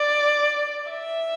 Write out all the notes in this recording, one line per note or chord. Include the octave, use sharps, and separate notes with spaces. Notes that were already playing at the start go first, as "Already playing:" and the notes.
Already playing: D5
E5